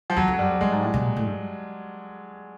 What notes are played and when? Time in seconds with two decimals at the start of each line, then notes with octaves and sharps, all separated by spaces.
0.10 F3
0.16 E2 F#3
0.28 F2
0.34 F#3
0.38 F#2 G3
0.49 F2
0.61 G2 G#3
0.72 G#2
0.82 A2
0.94 B2
1.05 A#2
1.16 A2
1.26 G2